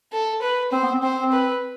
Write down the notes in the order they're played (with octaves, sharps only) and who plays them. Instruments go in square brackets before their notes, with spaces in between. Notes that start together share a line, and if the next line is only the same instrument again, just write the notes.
[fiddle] A4
B4
[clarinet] C4 [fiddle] C5
[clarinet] B3
C4
[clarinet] C4 [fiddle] C5
[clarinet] C4
[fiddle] B4